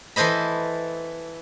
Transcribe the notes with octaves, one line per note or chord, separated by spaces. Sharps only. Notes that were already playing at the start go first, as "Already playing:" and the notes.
E3 A4 C5 D#5 B5